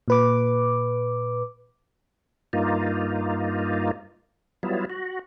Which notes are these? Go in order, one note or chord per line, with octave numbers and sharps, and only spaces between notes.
A#2 B4 D6
G2 A#3 D#4 F4
F#3 G3 B3 E4 F4
F#4